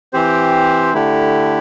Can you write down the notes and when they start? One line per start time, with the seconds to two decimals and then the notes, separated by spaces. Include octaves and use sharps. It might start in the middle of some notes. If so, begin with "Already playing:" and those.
0.13 E3 C4 G4 C5
0.93 D3 A3 E4 G4